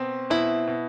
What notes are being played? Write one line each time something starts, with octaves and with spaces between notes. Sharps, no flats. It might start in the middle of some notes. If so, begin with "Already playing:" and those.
Already playing: B2 C4
B2 E4
B2